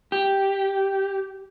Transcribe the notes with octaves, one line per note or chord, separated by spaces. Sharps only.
G4